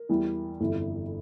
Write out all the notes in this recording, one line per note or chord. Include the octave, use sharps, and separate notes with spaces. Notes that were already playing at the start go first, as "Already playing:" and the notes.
Already playing: A#4
E2 E3 G3
G1 F2 E3